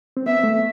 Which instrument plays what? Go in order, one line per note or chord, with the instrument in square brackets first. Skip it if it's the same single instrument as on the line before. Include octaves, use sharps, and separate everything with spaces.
[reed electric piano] C4
[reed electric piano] B3 [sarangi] E5
[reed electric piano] A3